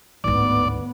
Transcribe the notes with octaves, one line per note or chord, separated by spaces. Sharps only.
G#1 D2 A2 B3 D5